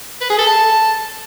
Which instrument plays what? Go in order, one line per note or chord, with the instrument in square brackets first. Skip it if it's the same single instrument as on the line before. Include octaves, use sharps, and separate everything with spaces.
[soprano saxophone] B4
G#4
A4
A5